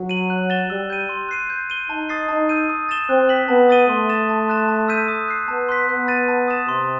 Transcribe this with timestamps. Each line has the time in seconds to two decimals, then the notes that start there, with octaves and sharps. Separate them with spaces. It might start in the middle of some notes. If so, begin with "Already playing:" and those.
Already playing: F#3
0.09 D#7 F#7
0.30 F#6
0.50 A6 E7 G7
0.70 G3 E6
0.90 G6 D#7
1.09 C6
1.29 F#6 C7 D#7
1.50 G6
1.70 D#7 G7
1.89 D#4 A5
2.09 D#6 A6 C7
2.28 D#4 A5
2.49 E6 G6 D#7
2.70 D#6
2.89 A6 E7 G7
3.09 C4 F#6
3.29 B6 F#7
3.48 B3 A5
3.69 D#6 A6 D#7 G7
3.88 A3 C6
4.09 D#6 A6 E7
4.29 A5
4.48 C6 F#6 A6 E7
4.68 A5
4.88 E6 G6 B6 D#7
5.08 D#6
5.28 F#6 C7
5.48 B3 A5
5.69 C6 F#6 B6
5.88 B3 F#6
6.08 A6 D#7
6.28 A5
6.48 D#6 A6 E7
6.68 C3 C6